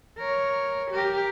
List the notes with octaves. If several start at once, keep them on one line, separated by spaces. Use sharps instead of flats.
A#4 C#5
G4 A#4